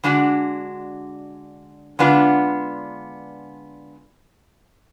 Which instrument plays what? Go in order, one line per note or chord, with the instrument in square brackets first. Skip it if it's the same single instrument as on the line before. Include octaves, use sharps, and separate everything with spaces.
[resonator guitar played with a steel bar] D3 G#3 D4 F#4
D3 G#3 B3 D4 F4